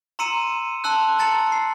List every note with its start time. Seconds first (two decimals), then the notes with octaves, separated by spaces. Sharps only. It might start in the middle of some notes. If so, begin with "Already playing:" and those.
0.19 A#5 C6 E6 C#7 D#7 E7
0.84 A5 C6 E6 F#6
1.19 A5 A#5 A6 C#7 F#7
1.52 C7